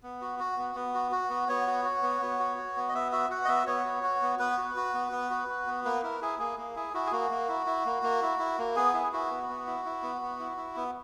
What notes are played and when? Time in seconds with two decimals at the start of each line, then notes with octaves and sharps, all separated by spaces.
0.03 B3
0.21 F#4
0.39 F#4
0.58 B3
0.75 B3
0.94 F#4
1.12 F#4
1.30 B3
1.48 B3 C#5
1.67 F#4
1.85 F#4
2.03 B3
2.22 B3
2.39 F#4
2.57 F#4
2.76 B3
2.89 D#5
2.94 B3 E5
3.12 F#4 E5
3.31 F#4 F#5
3.45 D#5
3.48 B3 E5
3.67 B3 C#5
3.85 F#4
4.03 F#4
4.22 B3
4.39 B3 B4
4.58 F#4
4.77 F#4
4.94 B3
5.12 B3
5.30 F#4
5.48 F#4
5.67 B3
5.85 A#3 B4
6.03 E4 A#4
6.21 E4 G#4
6.39 A#3 G#4
6.58 A#3
6.76 E4 G#4
6.94 E4 F#4
7.06 G#4
7.12 A#3 F#4
7.31 A#3
7.48 E4
7.66 E4
7.86 A#3
8.03 A#3
8.22 E4
8.39 E4
8.59 A#3
8.76 B3 G#4
8.94 E4
9.13 E4 F#4
9.31 B3
9.49 B3
9.66 E4
9.85 E4
10.03 B3
10.22 B3
10.39 E4
10.57 E4
10.76 B3